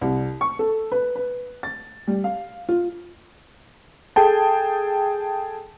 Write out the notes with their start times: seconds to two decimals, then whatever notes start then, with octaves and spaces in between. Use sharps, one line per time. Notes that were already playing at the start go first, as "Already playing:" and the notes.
0.01 C2
0.41 C#6
0.59 A4
0.92 B4
1.15 B4
1.63 A6
2.07 G3
2.24 F5
2.69 F4
4.16 G#4 A4 G5 A5